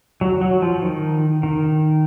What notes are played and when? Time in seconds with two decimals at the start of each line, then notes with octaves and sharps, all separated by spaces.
0.21 F#3
0.41 F#3
0.62 F3
0.82 D#3
1.43 D#3